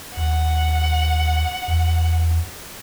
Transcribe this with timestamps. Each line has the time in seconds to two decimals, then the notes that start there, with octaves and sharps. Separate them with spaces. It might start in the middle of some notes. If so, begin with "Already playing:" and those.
0.17 D#2 F#5
1.68 E2